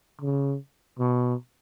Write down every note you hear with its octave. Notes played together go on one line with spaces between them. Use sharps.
C#3
B2